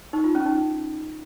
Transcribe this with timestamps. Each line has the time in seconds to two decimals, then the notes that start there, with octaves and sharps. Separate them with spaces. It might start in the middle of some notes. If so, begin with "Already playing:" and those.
0.13 D#4
0.24 F4
0.35 C#4
0.46 D#4